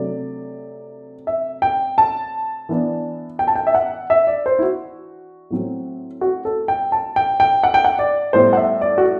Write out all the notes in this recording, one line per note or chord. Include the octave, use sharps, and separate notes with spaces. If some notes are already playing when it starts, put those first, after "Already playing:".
Already playing: C3 F#3 A3 D4 D5
E5
G5
A5
E3 B3 D4
G5
A5
G5
E5
F#5
E5
D5
C5
E4
F#4
A2 F#3 C4
F#4
A4
G5
A5
G5
G5
F#5
G5
F#5
D5
A2 G3 B3 C5
F#5
E5
D5
F#4